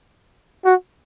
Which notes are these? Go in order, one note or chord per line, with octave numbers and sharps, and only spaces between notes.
F#4